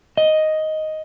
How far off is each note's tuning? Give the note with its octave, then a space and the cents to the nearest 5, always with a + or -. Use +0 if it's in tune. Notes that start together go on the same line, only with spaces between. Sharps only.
D#5 +5